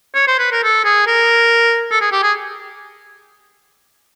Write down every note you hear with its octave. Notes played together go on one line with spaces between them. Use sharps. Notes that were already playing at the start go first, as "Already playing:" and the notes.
C#5
C5
B4
A#4
A4
G#4
A#4
A4
G#4
G4
G#4